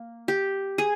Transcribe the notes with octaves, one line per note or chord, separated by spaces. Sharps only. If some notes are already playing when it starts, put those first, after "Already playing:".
Already playing: A#3
G4
G#4